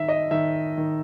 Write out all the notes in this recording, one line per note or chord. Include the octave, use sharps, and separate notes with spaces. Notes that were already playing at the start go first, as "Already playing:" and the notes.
Already playing: D#3 E5
D#5
D#3 E5
D#3